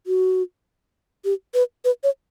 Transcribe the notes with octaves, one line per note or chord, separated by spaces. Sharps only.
F#4
G4
B4
B4
C#5